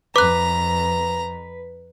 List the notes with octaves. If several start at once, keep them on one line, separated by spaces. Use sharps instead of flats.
F2 B4 A#5 D6 F#6